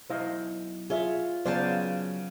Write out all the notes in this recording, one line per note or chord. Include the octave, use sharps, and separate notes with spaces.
B1 E4 C5 D#5 F5
F4 G#4 C#5 E5
C#3 F#3 B3 C5 D5 F5 A5